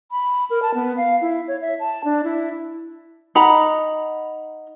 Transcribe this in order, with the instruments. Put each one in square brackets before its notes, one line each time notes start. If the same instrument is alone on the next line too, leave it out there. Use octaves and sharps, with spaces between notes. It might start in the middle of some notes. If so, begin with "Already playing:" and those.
[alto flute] B5
A#4
A5
B3
F5
E4
C#5
E5
A5
D4
E4
[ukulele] D#4 F#5 A#5 B5